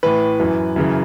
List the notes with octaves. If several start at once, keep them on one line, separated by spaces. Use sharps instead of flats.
A2 E3 B4
F#2 E3
F#2 C#3 E3